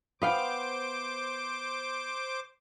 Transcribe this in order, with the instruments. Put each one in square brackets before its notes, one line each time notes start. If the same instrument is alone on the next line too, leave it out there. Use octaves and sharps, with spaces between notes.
[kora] B3 F5 G5 [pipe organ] C5 D6